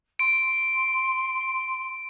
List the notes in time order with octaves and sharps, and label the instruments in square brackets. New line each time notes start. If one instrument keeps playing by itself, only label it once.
[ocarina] C6 [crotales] D7